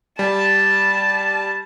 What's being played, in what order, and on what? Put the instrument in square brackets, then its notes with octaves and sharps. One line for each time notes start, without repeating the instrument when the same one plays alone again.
[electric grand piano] G3 [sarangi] A5